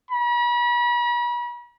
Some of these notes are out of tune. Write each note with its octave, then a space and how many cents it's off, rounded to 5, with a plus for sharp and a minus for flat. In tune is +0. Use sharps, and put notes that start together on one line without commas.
B5 -40